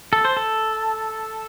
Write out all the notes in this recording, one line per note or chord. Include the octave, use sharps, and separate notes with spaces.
A4
C5
A4